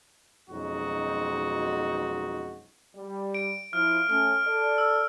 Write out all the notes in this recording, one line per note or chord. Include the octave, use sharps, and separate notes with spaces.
B1 F2 G#3 C#4 D#4 F#4
G3
D7
F3 E4 F6
A3 C#4 F6
A4 D5
E6